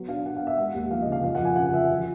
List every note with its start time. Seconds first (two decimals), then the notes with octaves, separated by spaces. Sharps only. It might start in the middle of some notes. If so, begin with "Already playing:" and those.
Already playing: F#3 B3
0.08 D4 F5
0.26 D4 F#5
0.36 F5
0.41 B3
0.47 E5
0.58 G#3 F#5
0.74 D#2
0.90 F3 F5
1.02 D#5
1.07 C#3
1.12 F5
1.23 F2 F5
1.35 F#5
1.40 F3
1.45 G#5
1.56 C#3 F#5
1.73 F3 E5
1.90 F3